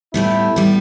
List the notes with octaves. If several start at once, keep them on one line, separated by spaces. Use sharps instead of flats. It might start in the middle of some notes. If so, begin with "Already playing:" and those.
A2 G3 B3 E4
A2 G3 B3